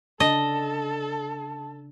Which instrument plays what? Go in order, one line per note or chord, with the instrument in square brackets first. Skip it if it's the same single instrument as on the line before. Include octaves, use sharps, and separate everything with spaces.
[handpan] C#3 D4 [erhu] A4 [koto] D#5 [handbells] A5